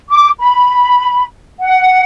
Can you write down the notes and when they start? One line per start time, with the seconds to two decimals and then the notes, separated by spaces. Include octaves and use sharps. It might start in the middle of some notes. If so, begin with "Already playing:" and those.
0.10 D6
0.40 B5
1.60 F#5